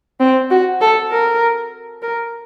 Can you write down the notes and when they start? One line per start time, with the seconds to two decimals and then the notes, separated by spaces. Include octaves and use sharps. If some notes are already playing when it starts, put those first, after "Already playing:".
0.20 C4
0.51 F#4
0.81 A4
1.12 A#4
2.02 A#4